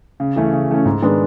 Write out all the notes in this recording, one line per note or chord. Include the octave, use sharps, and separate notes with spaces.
C#3
E3 A3 C#4
C#3
E3 A3 C#4
G#2
D#3 G#3 B3 D4